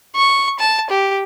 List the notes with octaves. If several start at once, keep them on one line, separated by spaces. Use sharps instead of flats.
C#6
A5
G4